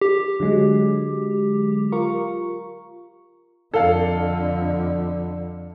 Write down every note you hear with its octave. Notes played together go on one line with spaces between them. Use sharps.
G4
D3 F#3 G#3
F4 A#4 C#6
F2 D3 A4 F5